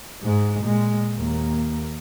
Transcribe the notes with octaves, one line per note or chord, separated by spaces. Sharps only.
G#2 G#3
A#2 G#3
D#2 A#3